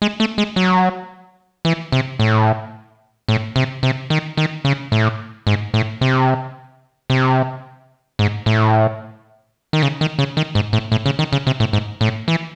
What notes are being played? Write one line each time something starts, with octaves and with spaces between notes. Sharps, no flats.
G#3
A3
G#3
F#3
E3
C3
A2
A2
C3
C3
D#3
D#3
C#3
A2
G#2
A2
C3
C3
G#2
A2
D#3
C#3
D#3
C#3
D#3
G#2
A2
A2
C#3
D#3
C#3
C3
A2
G#2
A2
E3